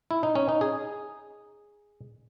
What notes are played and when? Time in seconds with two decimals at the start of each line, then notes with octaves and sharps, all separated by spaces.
0.11 E4
0.23 D#4
0.35 C#4
0.49 D#4
0.61 G#4